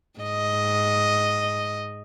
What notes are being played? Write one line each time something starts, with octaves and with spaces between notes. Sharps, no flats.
G#2 D#5